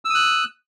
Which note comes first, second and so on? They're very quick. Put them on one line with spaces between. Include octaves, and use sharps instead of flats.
E6 D#6 F#6